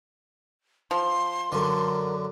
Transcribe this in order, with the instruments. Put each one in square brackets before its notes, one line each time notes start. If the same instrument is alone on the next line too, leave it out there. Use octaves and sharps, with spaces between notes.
[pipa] F3 [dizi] C6
[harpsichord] F#2 D3 [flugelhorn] A#4